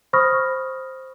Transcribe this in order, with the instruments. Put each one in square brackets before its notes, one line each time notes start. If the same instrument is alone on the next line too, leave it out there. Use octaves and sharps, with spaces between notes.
[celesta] C5 B5 C#6 D#6 F6 A#6